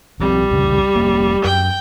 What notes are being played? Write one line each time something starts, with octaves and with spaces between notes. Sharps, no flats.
B1 F3 G3 C4
C2 F2 C#3
F1 A#3
F#2 G5